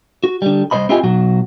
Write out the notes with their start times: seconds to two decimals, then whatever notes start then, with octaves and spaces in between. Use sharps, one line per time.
0.24 F#4
0.42 D3 G3
0.71 C2 G2 C5 D#5 B5
0.89 C4 E4 F4 G4 D#5 G#5
1.04 B2 F#3 F#4